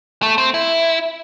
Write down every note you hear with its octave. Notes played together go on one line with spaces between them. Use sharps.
A3
C4
E4